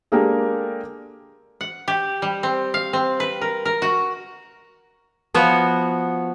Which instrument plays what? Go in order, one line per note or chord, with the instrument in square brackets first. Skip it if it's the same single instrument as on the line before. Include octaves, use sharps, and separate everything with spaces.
[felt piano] G#3 A#3 D4 G4 A4 A#4
[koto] F#5
G4
G3
C4
F5
C4
B4
A#4
A#4
F#4
F3 B3 F#4 C#5